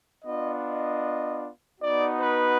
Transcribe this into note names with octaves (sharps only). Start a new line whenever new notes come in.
B3 D4 F4 D#5
D#5
B3 D#4 F#4 D5
B4